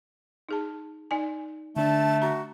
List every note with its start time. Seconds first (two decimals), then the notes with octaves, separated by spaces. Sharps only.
0.49 D#4 G#4 A5
1.11 D#4 D5 G#5
1.76 D3 A3 D4 A5
2.22 F#4 A#5